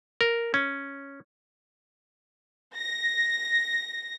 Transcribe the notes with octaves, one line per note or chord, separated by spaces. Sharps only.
A#4
C#4
A#6